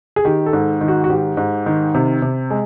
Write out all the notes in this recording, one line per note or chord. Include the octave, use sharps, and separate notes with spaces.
G#4
D#3 G4
A4
G#2
D#3
F#4
F#4
G#2 G4
G#2
D#3
C3
C3
G#3